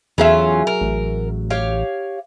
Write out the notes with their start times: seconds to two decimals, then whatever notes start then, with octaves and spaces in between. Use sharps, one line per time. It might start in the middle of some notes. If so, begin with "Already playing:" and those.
0.18 E2 F#3 C#4 F4 G#4 E5
0.67 A#4
0.81 A1
1.50 G4 C#5 F5